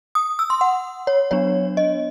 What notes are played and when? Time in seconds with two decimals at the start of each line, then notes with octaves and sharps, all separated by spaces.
0.15 D#6
0.39 E6
0.50 C6
0.61 F#5
1.07 C#5
1.31 F#3 B3 D4 C#5
1.77 D#5